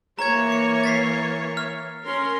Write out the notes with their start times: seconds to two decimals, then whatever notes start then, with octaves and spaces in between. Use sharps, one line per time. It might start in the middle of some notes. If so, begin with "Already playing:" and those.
0.19 E3 A#3 C#5 A#5 G#6
0.52 C#7
0.84 A6 B6 C7
1.57 F6
2.06 C#4 A#4 C6